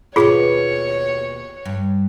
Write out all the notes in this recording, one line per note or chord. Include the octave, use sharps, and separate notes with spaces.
D#2 B2 B3 F4 G#4 C#5
G2